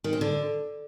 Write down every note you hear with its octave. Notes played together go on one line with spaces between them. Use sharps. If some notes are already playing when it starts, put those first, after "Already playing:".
D#3
C4
D3